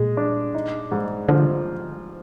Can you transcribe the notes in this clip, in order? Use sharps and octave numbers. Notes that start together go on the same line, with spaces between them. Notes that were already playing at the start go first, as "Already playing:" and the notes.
Already playing: A#2 G#3
D4
D#4
G#2
D3 F3